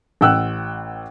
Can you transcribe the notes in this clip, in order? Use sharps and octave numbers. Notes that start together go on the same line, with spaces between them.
A1 F#5 G5 E6 F#6